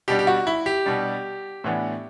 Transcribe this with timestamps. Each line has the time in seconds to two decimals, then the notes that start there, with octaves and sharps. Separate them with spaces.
0.08 B2 G3 D4 G4
0.19 G4
0.27 F#4
0.47 E4
0.66 G4
0.86 B2 G3 D4
1.64 A2 E3 B3 D4